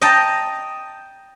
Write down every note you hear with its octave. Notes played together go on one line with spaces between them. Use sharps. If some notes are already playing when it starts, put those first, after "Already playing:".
D#5 G5 A5 A#5